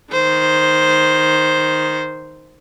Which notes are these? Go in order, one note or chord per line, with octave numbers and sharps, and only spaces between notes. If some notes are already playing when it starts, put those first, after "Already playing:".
D#3 C5